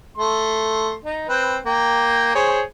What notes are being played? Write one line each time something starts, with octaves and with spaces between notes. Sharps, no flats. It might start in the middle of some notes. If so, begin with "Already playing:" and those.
A3 C6
D#4
C4 B4
A#3 G5
G#4 C5 C#5